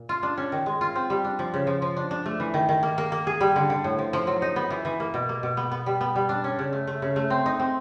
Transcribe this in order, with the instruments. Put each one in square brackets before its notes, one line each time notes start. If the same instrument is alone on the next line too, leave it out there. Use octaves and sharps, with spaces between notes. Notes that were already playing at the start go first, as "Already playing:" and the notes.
Already playing: [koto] A#2
F4
D4
C#4
D#3
G#3
F4
C4
G3
D4
F3
C#3
F3
F3
D4
D4
A3
E3
D#3
D#3
A#3
A#3
A#3
G#4
G3
D3
D3
A2
F3
F3
F#3
D#4
B3
E3
E3
A#3
B2
A#3
B2
B3
B3
G3
B3
G3
D4
C#4
C#3
A3
A3
C#3
A3
C4
D#4
C4